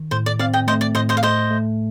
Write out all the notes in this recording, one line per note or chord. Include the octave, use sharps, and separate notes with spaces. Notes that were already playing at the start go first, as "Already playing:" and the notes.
Already playing: D#3
A2 C5
D5
C4 D5 F5
D#5 G5
A3 C5 D#5
D5
A2 C5 D#5
C5 D#5
F5
A3 C5 D#5
A3